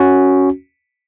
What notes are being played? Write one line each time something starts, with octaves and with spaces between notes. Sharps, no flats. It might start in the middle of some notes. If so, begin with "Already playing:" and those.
Already playing: C#4 F#4